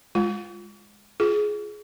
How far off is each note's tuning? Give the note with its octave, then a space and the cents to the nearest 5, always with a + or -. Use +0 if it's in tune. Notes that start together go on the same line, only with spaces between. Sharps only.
G#3 -5 F4 +0
F4 +0 G#4 +15